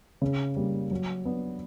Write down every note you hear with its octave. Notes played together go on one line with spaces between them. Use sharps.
C#3
G3 A#3
F#3
B3 D4